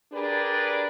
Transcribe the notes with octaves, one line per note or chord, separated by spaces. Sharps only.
D4 G4 G#4 A#4 B4 D5